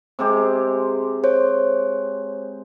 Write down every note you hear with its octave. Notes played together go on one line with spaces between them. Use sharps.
C3 G#3 G4
C5 C#5